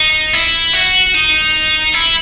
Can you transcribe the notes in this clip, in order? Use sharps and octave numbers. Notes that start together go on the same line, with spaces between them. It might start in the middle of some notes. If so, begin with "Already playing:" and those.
Already playing: D#4
E4
F#4
D#4
E4